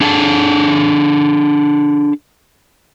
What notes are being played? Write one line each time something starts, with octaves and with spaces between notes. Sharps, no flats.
D4 G#4 A4 G#5 A5